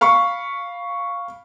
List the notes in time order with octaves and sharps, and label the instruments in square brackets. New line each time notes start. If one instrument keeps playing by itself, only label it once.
[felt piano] F5 B5 C#6